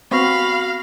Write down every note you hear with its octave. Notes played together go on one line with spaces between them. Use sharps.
B3 C4 F#4 F5 B5 C#6 A#6